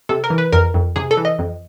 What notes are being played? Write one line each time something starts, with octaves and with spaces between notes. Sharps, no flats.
C3 A4
A#4
E3
B4
F2 A#4
F2
C3 G#4
A4
E3
D#5
F2